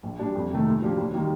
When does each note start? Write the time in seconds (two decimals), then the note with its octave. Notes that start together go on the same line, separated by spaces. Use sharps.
0.03 A#1
0.19 A#2 G3 D4
0.35 F2
0.50 C3 D#3 A3
0.66 A#2
0.82 F3 A#3 D4 G4
0.98 D#2
1.14 D#3 G3 A#3